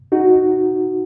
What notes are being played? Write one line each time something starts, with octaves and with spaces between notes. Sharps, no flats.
D#4 F#4